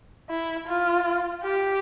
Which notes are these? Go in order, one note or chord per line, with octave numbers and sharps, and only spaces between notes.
E4
F4
G4